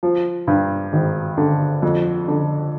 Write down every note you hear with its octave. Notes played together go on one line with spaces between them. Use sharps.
F3
G2
G#1
D3
F2
D3